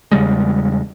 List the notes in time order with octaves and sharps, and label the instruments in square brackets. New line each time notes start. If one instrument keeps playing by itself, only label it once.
[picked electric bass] E2 C#3 G3 G#3